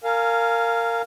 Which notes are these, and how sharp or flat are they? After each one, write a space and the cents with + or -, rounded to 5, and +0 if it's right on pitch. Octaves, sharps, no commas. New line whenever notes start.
A#4 -20 F5 +0 G#5 +10